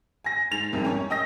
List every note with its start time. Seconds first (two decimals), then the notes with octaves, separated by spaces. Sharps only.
0.24 G#5 A#6
0.51 G#2 A6 F7
0.72 C2 F2 C3 D#3 G#3
0.85 C#4 A#4 C#5
1.10 D#5 G5 D#6 E6 A#6